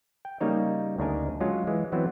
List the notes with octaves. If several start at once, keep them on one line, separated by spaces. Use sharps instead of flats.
G5
C#3 G3 A#3 D#4 C#5
D2 C#3 D4 D#4 A#4 G#5
F#3 G#3 C#4 F4
E3 G#3
E3 F#3 B3 C4 C5